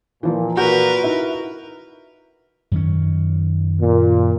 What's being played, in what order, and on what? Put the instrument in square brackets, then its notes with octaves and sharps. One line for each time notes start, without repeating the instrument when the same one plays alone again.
[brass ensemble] A#2 [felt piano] E3 F3 A#3
[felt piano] F4 G6 [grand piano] F#4 [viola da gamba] A#4 B4
[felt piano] D#4 E4 E5
[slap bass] F#2 D#3 C#4
[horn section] A#2